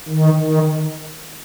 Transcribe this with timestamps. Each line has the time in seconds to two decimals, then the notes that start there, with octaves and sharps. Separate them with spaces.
0.09 D#3
0.38 D#3